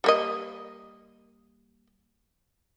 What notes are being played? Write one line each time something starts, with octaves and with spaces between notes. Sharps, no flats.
G3 A#3 D#5